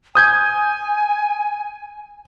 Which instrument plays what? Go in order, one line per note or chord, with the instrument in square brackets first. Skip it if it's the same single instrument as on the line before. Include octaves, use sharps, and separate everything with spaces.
[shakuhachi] G#5 [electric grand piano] D#6 G6 G#6